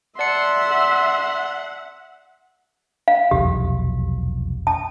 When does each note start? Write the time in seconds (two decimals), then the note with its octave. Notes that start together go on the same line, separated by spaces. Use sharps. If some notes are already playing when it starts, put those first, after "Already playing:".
0.19 D5 E5 F#5 A5 C6 C#7
3.08 F5
3.31 F1 B1 E2 G4
4.67 A5